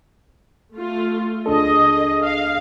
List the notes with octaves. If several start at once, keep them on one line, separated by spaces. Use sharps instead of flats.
A3 F4
C#2 D4 G#4 A4 D#5
F5